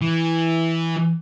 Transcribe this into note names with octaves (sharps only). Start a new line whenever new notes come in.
E3